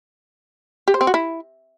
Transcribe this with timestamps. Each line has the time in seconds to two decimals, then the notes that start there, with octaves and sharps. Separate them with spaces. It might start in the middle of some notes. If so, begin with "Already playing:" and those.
0.88 G4
0.94 C5
1.01 C4
1.07 F#4
1.14 E4